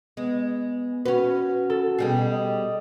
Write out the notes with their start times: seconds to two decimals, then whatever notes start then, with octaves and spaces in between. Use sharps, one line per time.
0.17 G#3 B3
1.05 C#4 F#4 B4
1.70 A4
1.99 B2 G3 G#4
2.31 D#5